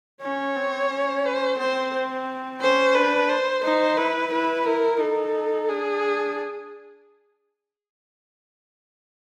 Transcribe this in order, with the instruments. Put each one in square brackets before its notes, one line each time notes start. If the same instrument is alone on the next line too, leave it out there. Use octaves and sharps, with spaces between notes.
[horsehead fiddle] C#4 [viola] C#5
[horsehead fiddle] C4
C#4
[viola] C5
[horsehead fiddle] C4 [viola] C5
[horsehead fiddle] C#4 [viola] C5
[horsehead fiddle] D4 [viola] B4
[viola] C5
[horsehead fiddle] D#4 [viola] C5
[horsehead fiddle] E4 [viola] B4
[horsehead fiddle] E4 [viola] B4
[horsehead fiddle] E4 [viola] A#4
[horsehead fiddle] D#4 [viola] A4
[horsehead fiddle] D4 [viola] G#4